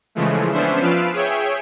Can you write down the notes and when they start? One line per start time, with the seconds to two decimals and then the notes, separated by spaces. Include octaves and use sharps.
0.15 C#3 E3 F3 G#3 A3
0.51 B3 C#4 D4 C5 E5
0.81 F3 F4 B4 F5 E6 D7
1.13 G#4 C#5 E5 G5